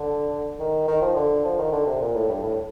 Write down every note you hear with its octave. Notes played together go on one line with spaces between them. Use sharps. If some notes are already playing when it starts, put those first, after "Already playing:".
Already playing: D3
D#3
D#3
F3
D3
F3
D#3
D3
C3
A#2
A2
G2
A2